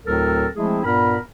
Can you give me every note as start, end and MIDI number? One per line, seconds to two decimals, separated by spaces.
0.05 0.47 38
0.05 0.47 45
0.05 0.47 54
0.05 0.47 60
0.05 0.47 69
0.05 0.47 70
0.56 0.80 53
0.56 0.80 56
0.56 0.80 57
0.56 0.80 60
0.56 0.80 64
0.56 0.80 68
0.84 1.18 43
0.84 1.18 46
0.84 1.18 59
0.84 1.18 70
0.84 1.18 83